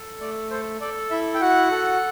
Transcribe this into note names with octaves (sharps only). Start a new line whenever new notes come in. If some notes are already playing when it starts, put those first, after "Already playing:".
Already playing: A4
A3 D5
A4 C5
A4 D5
E4 E5
G5
F#4 F#5
A4